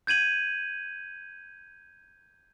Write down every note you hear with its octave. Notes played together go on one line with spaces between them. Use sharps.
G6 G#6 D#7 F#7